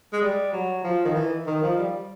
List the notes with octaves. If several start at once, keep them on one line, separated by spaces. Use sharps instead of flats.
G#3
G3
F#3
F3
D#3
E3
D#3
F3
G3